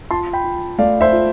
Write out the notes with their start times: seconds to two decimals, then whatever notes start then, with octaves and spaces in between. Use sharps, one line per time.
0.11 F4 A5 C6
0.33 G5 B5
0.44 F4
0.78 A3 D5 F5
1.01 C5 E5
1.12 F4